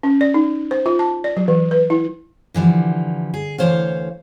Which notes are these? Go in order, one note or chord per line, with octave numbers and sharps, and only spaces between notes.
C#4
D5
D#4
C5
F4
A5
D5
F#3
E3
B4
E4
D3 E3 F3 G3
G#4
D2 G2 E3 C5 C#5 F5